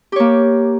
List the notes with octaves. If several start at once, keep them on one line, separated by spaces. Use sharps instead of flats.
A#3 G4 C#5